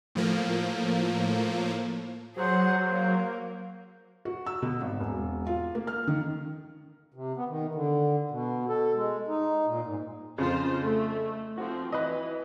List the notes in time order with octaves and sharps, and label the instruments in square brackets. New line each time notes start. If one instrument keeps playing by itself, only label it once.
[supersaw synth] A2 F3 A#3
[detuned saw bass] F#3 [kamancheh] G#4 F#5 [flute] C5
[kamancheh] A#3
[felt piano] F#4
E6
B2
G#1
E1
F4
A#3
F6
D#3
[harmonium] C3
B3
D#3
D3
B2
A4
G#3
D#4
A#2
G#2
[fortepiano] F2 C#3 [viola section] F4 C5
[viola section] A3
[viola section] F3 C4 [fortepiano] F#4
[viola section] E3 [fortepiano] B4 D#5